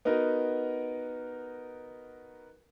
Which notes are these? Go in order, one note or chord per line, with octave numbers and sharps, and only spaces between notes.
B3 D#4 F#4 A#4